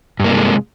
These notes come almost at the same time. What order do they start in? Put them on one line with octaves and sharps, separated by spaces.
G2 A#3 C3 G#3